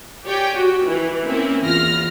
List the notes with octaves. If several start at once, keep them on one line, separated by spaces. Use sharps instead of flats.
G4 C#5 D5 G5 G#5
F#4
E3
A#3 C4 C#4 E4
E2 F4 F6 A#6